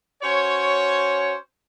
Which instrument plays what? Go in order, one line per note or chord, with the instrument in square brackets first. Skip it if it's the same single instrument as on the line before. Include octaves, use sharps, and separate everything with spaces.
[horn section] C#4 F#4 C5 C#5